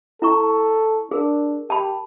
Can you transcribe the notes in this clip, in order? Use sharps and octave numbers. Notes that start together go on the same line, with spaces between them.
E4 A4 A#5 C#6
D4 G#4 A#4
G4 A5 B5